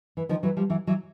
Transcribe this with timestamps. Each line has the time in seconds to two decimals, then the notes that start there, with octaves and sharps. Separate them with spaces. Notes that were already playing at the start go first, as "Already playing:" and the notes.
0.17 E3
0.29 D#3 F3
0.43 E3 F#3
0.57 F3 G3
0.70 E3 F#3
0.87 E3 F#3